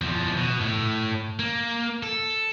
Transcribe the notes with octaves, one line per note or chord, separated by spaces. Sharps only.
E2 F3
B2
A2
A#3
A4